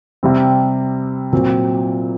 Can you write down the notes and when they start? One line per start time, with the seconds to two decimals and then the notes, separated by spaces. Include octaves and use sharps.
0.23 C3 G3 C4
1.33 A#2 F#3 C4